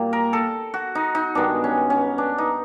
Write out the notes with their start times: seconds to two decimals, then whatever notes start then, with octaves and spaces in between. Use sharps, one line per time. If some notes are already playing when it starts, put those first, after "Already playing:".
Already playing: A#2 G3 A#3
0.13 A#4
0.33 A4
0.74 F#4
0.95 D#4
1.15 D#4
1.35 G2 D#3 G#3 B3 D4
1.64 C#4
1.90 C#4
2.18 D4
2.38 D#4